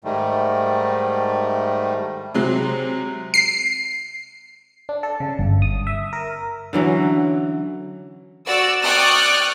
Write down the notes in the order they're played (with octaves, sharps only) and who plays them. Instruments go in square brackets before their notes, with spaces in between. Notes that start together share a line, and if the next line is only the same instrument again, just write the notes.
[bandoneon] G#2 D#3 G3 A3
[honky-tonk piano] C3 F#3 G#3
[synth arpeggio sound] C7
[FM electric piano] D4
A4
C#3
G1
D#6
E5
A#4
[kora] D3 E3 F#3 C#4
[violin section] F#4 D5 E6
D5 G5 C#6 D#6 F6 F#6